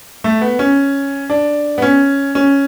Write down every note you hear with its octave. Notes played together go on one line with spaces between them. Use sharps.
A3
B3
C#4
D4
B3
C#4
C#4